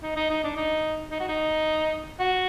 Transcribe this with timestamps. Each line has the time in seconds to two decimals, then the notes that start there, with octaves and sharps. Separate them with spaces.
0.03 D#4
0.17 D#4
0.30 D#4
0.44 D4
0.57 D#4
1.11 D#4
1.20 F#4
1.29 D#4
2.20 F#4